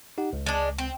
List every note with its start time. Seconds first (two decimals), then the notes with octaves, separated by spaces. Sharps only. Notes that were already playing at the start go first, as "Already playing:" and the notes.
0.18 D#4 G4 F#5
0.33 C#2
0.46 G#3 D4
0.78 C4